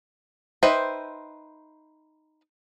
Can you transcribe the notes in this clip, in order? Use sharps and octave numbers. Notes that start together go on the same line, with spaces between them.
D#4 B4 C5 E5 G5